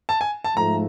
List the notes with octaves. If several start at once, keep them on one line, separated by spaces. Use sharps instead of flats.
A5
G#5
A5
G#2 F3 A3 A#5